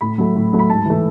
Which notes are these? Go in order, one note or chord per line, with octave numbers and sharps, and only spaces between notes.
A2 B5
F#3 A3
A2
F#3 A3
B5
G#2 A5
E3 A3